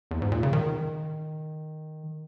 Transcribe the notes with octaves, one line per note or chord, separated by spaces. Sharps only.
E2
G#2
A#2
C#3
D#3